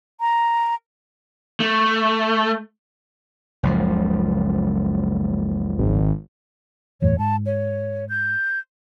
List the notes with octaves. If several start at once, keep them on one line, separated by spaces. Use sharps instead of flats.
A#5
A3
F#1 C#2 F3
G#1
F#1 E2 A2 C#5
G#2 A5
C#5
G6